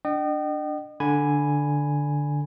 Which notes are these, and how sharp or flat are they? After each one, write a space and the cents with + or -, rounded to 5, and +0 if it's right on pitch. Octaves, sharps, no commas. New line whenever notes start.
D4 +0 D#5 -35 G5 -35
D3 +0 G#5 +0 B5 +0